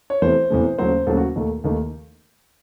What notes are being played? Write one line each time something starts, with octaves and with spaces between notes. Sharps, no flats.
C#5
E2 C3 E3 A3 C5
E2 C3 E3 A3
D#2 C#3 F#3 A3 C5
D#2 C#3 F#3 A3 A4
F#4
D#2 D#3 A3
D#2 D#3 A3